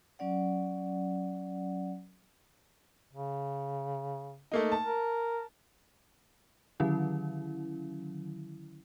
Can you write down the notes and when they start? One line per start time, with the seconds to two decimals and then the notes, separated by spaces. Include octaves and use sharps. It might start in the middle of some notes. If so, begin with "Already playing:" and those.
0.19 F#3 C#4 D5 F#5
3.13 C#3
4.52 A3 A#3 D#4
4.72 A5
4.86 A#4
6.80 D3 D#3 F#3 C#4 E4